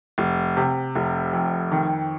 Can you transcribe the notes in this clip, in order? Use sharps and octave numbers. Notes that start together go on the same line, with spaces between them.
F1
C3
F1
F2
D#3